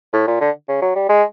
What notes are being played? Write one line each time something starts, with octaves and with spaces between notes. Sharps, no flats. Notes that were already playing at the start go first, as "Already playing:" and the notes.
A2
A#2
D3
C#3
F#3
G3
G#3